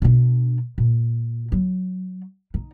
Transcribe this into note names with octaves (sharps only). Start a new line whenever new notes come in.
B2 D4
A#2
F#3
D#4